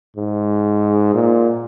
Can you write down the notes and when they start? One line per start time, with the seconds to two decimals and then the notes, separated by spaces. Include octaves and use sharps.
0.17 G#2
1.14 A#2